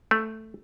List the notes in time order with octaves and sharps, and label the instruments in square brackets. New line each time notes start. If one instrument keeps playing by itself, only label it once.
[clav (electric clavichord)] A3